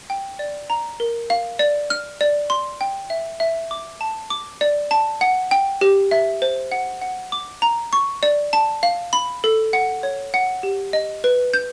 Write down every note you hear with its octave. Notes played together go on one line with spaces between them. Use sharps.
G5
D5
A#5
A#4
F5
D5
F6
D5
C6
G5
E5
E5
D6
A5
D6
D5
A5
F#5
G5
G4
E5
C5
F#5
F#5
D6
A#5
C#6
D5
A5
F5
B5
A4
F#5
C#5
F#5
G4
D#5
B4
G6